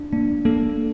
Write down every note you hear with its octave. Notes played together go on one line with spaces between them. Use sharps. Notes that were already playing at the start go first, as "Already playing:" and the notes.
Already playing: D4
A#3 D4
A#3 A4